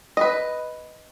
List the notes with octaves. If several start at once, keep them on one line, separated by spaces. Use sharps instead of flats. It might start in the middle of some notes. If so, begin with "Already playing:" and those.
B4 D#5